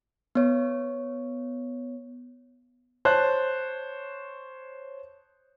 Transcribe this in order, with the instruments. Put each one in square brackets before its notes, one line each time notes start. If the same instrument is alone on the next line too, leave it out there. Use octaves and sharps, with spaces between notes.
[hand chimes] B3 C#5
[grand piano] C5 C#5 A5 F#6